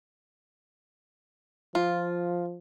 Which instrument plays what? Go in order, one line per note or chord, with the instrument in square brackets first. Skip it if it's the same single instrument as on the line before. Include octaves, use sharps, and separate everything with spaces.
[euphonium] F3 [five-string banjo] F4